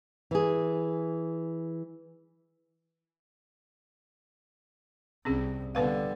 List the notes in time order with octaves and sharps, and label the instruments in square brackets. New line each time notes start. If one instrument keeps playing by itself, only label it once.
[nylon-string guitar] E3 G#4
[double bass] C2 [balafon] C4 C#4 G#4
[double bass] D3 G3 [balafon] B3 B4 F5